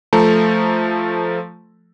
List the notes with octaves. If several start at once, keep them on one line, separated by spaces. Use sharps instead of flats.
F3 A3 A4 A#5